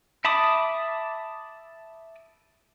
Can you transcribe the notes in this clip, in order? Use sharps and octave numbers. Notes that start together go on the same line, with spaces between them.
E5 A5 B5 D6 D#6